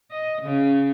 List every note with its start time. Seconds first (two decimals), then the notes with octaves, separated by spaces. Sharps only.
0.12 D#5
0.42 C#3